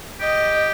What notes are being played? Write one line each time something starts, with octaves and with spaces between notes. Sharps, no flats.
G4 D#5